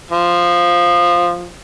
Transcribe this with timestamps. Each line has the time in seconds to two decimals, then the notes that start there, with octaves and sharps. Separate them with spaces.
0.11 F3